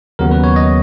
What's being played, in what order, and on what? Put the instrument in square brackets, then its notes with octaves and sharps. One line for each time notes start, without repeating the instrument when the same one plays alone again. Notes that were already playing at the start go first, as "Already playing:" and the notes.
[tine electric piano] D#2 C#3 F#3 B3 A#4
B4
C#5
D#5